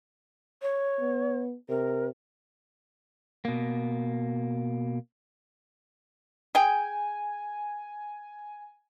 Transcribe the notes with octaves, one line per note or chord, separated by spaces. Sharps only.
C#5
B3
C3 A#4
B2 A#3
G#4 G5 G#5